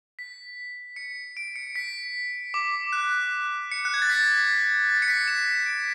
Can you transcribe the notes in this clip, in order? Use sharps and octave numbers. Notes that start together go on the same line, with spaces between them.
B6
C#7
D7
C#7
B6
D6
F#6
C#7
F#6
G#6
A6
B6
A6
C#7
B6
E7
D7